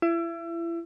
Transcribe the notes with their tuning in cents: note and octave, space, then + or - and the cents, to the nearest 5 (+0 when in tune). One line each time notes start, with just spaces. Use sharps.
E4 +30